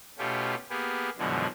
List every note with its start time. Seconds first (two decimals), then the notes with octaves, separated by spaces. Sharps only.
0.18 B2 A3 C#4 F4 G4
0.70 A#3 B3 G4 G#4
1.18 F#2 B2 D3 E3 F3 G#3